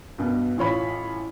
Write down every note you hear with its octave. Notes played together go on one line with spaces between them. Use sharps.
G2 B2
A1 F4 C#5 B5